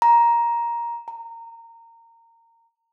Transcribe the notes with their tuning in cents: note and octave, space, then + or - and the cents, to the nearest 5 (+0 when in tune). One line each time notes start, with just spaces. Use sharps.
A#5 +10
A#5 -20